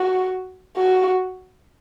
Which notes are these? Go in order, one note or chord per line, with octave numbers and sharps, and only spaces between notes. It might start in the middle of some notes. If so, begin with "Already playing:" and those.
Already playing: F#4
F#4